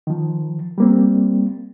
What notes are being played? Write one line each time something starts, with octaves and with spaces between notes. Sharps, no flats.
D#3 F3
G3 A#3 C4